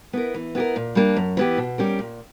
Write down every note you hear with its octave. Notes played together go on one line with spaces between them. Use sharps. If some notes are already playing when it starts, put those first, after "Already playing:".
B3 E4 A#4
E3
B3 E4 G4 A#4
A#2
G3 A#3 D4
F#2
E3 B3 E4 G4
B2
G3 C#4 G4 A#4
A#2